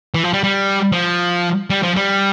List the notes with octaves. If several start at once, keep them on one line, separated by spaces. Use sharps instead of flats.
E3
F3
G3
G3
F3
G3
F3
G3